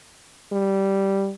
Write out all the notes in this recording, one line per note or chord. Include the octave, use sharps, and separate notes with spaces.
G3